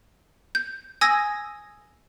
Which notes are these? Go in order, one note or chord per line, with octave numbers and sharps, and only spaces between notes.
G6
G#5 D#6 E6 G#6 A#6